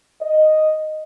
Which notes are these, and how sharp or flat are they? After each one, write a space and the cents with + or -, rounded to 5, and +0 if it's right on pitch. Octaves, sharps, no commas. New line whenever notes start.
D#5 -5